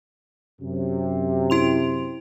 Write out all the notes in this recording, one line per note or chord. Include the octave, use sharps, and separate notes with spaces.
F#2 C3
E4 C6 F7